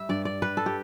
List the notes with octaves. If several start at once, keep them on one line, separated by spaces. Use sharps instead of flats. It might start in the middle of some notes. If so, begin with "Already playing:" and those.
Already playing: G3 E5
G2 D5
D5
G3 B4
A4
G4